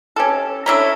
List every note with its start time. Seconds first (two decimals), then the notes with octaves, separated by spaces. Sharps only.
0.16 C#4 G4 A4
0.66 C#4 D4 E4 A4 C#5 A#5